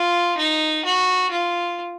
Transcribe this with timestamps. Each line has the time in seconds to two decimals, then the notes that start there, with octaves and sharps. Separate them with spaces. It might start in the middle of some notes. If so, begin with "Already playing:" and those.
Already playing: F4
0.38 D#4
0.85 F#4
1.31 F4